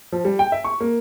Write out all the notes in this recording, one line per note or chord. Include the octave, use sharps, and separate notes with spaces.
F3
G3
G5
E5
C#6
A#3